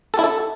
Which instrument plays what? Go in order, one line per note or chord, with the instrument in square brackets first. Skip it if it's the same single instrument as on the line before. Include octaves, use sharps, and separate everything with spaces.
[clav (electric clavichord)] A4
E4
A4